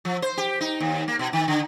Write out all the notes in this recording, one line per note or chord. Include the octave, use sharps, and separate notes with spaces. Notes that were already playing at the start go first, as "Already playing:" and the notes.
F3
C5
G4
D#4
D#2
A#3
B2
D#3
D3